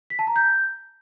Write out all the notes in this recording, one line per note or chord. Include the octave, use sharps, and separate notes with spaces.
B6
A5
A#5
G6